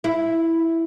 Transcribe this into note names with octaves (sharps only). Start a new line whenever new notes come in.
E4